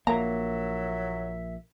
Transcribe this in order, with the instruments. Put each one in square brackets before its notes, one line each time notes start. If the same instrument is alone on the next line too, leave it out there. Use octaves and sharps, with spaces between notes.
[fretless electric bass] A#1 A#3 [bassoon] F#3 [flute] E5 [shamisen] A#5